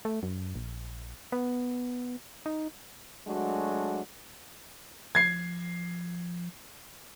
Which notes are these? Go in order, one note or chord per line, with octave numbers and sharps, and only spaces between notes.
A3
F#2
A#1
B3
D#4
F#3 G#3 A3 D4 F#4
F3 G#6 C7